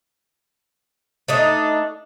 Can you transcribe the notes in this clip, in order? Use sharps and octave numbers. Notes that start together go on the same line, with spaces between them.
A3 D4 D#4